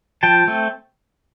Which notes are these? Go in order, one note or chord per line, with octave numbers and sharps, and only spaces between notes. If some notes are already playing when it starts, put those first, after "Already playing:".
F3 G5 A5
A3 C4